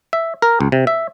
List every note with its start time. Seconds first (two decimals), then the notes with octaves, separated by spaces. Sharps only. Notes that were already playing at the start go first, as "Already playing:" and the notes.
0.13 E5
0.42 A#4
0.61 C#2
0.72 C3
0.87 E5